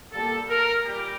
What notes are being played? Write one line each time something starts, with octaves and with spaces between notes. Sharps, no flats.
A#2 G3 A#3 A4
A#4
A#2 G3 G4